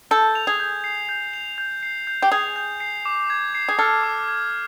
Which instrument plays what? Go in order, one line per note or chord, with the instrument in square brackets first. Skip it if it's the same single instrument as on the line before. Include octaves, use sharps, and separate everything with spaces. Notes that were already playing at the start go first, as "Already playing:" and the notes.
[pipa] A4 [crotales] G6
[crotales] F7
[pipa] G#4
[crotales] G6
C7
G6
F7
G6
C7
G6
[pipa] G4
[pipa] G#4 [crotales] F7
[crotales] G6
C7
D6
G#6
C7
[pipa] G#4
[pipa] A4 [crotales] F6
[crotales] D6
G#6